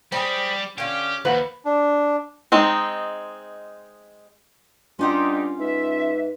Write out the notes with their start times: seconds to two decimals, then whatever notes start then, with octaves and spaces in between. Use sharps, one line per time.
0.12 G3 C4 G4 G#4 B5
0.78 D3 C#4 F4 G4
1.25 D#2 F3 B4 F#5
1.65 D4
2.52 G#3 C4 D#4
4.99 G2 C#4 D#4 F4 G4 F#5 C6
5.59 G#2 B4 E5